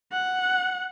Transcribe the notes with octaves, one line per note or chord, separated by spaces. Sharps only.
F#5